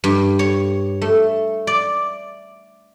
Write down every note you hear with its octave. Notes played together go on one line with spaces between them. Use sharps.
G2
C#5
A3
D5